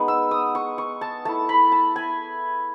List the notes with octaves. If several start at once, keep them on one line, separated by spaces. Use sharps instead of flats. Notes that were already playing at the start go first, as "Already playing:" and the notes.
Already playing: G#3 B3 D#4
E6
D#6
C#6
C#6
A5
A3 E4 A5
B5
A5
G#5